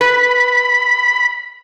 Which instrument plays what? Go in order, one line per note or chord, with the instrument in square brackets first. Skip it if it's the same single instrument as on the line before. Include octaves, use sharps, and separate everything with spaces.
[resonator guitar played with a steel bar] B4 [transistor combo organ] B5